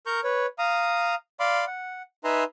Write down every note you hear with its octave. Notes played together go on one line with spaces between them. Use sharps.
A#4 A#5 C#6 G6
B4 C#5
F5 A#5 D#6
D5 F5 B5 C6 D6
F#5
D#4 B4 E5 G#5 A#5 C6